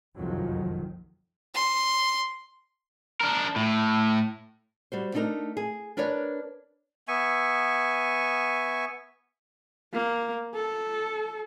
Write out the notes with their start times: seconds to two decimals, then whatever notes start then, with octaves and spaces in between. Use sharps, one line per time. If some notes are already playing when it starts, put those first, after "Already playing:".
0.17 F#1 C2 F2 D#3 F3 F#3
1.54 C6
3.21 D4 A#4
3.56 A2
4.92 G3 F#4 C5
5.14 A3 D4 D#4 A4 A#4
5.57 G#4
5.97 D4 A#4 B4 C#5 D5
7.08 B3 E5 G#5 C#6
9.93 A#3
10.54 A4